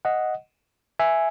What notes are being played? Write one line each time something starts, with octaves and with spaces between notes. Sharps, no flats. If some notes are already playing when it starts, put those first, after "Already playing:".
D#5 F#5
E5 G#5